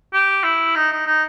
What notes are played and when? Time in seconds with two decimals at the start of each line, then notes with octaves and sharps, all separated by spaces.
0.14 G4
0.44 E4
0.75 D#4
0.92 D#4
1.07 D#4